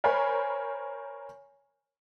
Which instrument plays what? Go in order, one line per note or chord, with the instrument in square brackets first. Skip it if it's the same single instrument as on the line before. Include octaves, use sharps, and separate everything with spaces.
[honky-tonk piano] A#4 C5 C#5 G#5 B5